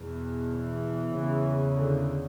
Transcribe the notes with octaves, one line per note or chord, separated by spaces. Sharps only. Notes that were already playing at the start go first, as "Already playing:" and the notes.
Already playing: E2 B2
E3
E2 C#3
D3